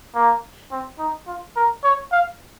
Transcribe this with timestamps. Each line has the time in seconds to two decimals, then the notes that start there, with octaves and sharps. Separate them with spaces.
0.15 A#3
0.72 C4
0.99 D#4
1.27 F4
1.56 A#4
1.84 C#5
2.12 F5